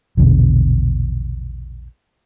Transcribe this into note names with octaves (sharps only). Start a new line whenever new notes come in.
A#1 E2 B2 D3